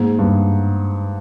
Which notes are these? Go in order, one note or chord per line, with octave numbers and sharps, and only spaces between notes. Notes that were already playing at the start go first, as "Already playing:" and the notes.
Already playing: G#2 A#3 G#4
G2